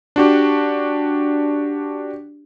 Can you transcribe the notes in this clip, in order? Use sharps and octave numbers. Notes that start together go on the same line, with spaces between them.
D4 F#4 G4